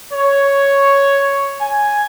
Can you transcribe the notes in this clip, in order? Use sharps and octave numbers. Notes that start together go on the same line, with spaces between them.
C#5
G#5